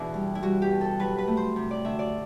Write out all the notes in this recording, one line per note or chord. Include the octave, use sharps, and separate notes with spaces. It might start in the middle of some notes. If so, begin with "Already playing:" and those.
Already playing: E2 B2 D4 E4
G3
E4
G3 F#4
G4
B2
A4
F#3 B4
B4
A3
C5
C3
D5
D2 E5
D5